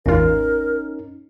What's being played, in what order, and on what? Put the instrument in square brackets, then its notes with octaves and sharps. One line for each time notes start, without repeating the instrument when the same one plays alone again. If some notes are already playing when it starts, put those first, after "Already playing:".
[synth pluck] A1 E2 F4 [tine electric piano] C#4 D#4 [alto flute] A#4